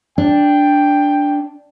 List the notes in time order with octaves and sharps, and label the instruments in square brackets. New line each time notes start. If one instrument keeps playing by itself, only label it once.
[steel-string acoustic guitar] D4 [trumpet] G5